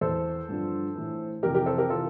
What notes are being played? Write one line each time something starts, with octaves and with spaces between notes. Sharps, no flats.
E2 E3 A4 C5
G2 D3 F3
A2 E3
F2 C3 E3 G4 A#4
G4 A#4
A4 C5
G4 A#4
C3 E3 F4 A4